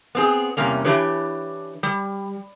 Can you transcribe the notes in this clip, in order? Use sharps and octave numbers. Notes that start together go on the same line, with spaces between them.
B3 C4 G#4
E2 G2 C3 G3 A#3 C#4
E3 D4 G4 B4 C#5
G3